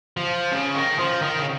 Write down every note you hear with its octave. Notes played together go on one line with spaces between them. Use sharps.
F3
C#3
D#3
F3
D#3
C#3